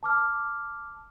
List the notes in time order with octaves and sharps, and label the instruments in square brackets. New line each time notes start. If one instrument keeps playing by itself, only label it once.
[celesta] A5 D6 F6